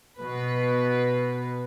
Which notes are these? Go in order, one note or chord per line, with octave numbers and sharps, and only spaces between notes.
B2 B4